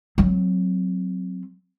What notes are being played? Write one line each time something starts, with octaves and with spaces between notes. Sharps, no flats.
F#3 C4